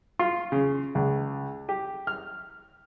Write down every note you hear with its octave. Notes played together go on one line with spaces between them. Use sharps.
F4
C#3
C#2
G4
F6